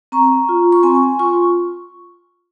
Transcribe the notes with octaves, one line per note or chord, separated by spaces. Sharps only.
C4 A#5 C#6
F4
C#6
C4 G#5 C6
F4 C#6